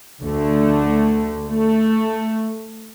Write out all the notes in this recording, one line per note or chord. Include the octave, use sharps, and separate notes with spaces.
D2 D3 A3
A3